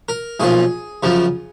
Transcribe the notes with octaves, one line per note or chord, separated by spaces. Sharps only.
A#4
B1 A#2 F3 G#4
F#2 C#3 F3